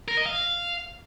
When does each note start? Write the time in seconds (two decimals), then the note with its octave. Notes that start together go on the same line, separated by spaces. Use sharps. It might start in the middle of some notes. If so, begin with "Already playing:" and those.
0.08 A#4
0.17 D#5
0.26 F5